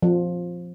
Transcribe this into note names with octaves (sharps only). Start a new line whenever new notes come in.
F3